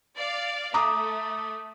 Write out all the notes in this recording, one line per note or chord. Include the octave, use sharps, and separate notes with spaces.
D5 F5
A3 A#5 D6 D#6